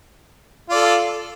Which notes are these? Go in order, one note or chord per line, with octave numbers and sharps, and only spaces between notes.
F4 A4 D5